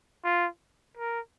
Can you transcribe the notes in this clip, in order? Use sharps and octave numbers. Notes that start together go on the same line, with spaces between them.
F4
A#4